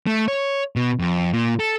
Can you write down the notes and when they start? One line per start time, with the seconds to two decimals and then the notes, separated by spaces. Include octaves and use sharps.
0.07 A3
0.28 C#5
0.76 B2
1.00 F2
1.33 A#2
1.60 A4